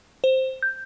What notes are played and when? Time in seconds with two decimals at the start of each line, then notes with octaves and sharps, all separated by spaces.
0.24 C5
0.63 G6